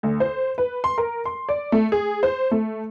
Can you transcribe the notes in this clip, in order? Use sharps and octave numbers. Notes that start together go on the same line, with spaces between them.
D2
C5
B4
C6
A#4
C6
D5
A3
G#4
C5
A3